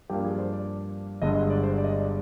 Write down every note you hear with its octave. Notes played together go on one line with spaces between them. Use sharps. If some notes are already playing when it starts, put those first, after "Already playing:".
G2 F3 A#3 D4 G4
G#4
D5
C5
D5
G1 G2 D3 G#3 D#5
D#5
D5
C5
D5
D#5
D5